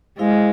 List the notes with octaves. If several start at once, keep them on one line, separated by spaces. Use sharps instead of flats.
G#3 E4 G#4 C5 F5